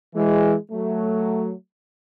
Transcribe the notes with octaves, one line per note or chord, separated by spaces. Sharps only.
E3 G#3
F#3 A3